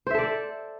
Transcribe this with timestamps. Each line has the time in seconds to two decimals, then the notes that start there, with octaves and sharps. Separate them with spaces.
0.07 C5
0.11 E5
0.15 A4
0.18 D5